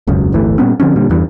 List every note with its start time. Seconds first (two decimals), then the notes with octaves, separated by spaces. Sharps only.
0.07 E1 C#2 F#2 C#3
0.32 D1 G1 E3 A3
0.58 A#2 G3 B3 C#4
0.80 D3 F3 C4 C#4
0.96 A#2 D3 G3
1.10 E2 G2 E3